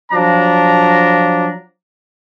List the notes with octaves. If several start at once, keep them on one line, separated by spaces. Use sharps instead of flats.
F3 F#3 D4 A#5